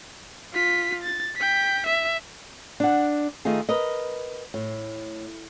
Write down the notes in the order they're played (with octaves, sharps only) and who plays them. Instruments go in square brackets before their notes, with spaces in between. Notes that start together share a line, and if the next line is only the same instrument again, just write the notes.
[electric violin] F4 B6
A6
G5 B6
E5
[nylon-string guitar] D4 F#5
D#3 A3 D#4 F4 G#4
A#4 B4 D#5
A2